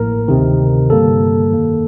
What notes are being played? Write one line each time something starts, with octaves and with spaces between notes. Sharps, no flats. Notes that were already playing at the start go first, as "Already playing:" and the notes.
Already playing: A1 A2 F3 A#3 A#4
D2 C3 D#3
G2 D3 G3 A#3 A4
F2 D#3 A#3